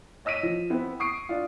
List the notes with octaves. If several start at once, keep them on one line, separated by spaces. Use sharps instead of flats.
C#5 D#5 E6 B6 D#7
F3
B3 C4 E4
C#6 D#6 C7 D7
D4 F4